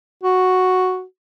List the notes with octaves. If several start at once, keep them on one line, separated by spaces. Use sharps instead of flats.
F#4